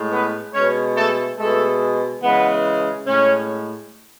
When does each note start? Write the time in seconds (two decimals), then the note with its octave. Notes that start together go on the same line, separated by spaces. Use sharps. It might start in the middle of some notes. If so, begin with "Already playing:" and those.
Already playing: A2 G#3
0.11 B3 B4
0.53 B2 G#3 C#4 C#5
0.95 A3 A4
1.37 B2 G#3 A3 A4
2.21 C#3 E3 G#3 B3 B4
3.06 A2 G#3 C#4